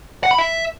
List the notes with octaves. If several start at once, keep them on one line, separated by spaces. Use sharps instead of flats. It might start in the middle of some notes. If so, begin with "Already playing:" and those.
F#5
B5
E5